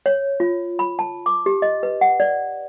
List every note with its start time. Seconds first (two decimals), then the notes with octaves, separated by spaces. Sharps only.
0.06 C#5
0.40 F4
0.79 B5
0.99 A5
1.26 D6
1.46 G4
1.62 D#5
1.83 B4
2.01 F#5
2.20 D5